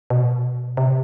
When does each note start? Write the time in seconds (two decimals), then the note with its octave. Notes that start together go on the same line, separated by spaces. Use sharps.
0.10 B2
0.77 C3